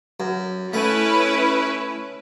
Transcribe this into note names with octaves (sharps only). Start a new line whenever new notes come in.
F#2
A3 C#4 E4 B4